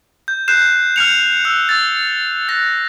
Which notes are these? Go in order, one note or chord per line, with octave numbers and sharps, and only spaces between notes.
G6
F#6 G6 C7 E7
F6 G6 C#7 F7
E6 F#6
E6 A6
F#6 A#6